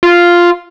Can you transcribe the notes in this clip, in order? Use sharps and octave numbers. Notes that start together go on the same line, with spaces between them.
F4